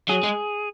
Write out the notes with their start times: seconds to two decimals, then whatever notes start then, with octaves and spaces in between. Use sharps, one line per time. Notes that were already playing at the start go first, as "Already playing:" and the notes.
0.09 F#3 G#4
0.23 G#3